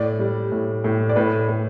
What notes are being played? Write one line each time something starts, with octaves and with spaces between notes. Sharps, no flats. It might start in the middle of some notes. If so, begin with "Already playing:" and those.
Already playing: A2 D5
G3
A2
A2
D5
A2 B4
A2